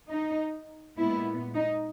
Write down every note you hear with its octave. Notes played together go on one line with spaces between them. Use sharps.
D#4
A#2 G#3 B3 E4
D#4